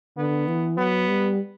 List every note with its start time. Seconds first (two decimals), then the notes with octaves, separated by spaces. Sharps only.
0.17 D3 B3
0.48 E3
0.78 F#3 B3
1.08 G3